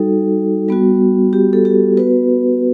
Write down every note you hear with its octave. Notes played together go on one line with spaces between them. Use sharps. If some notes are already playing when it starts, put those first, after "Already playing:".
Already playing: G3 D#4 F#4 A4
G3 B3 F#4
G4
A4
G4
B3 F#4 B4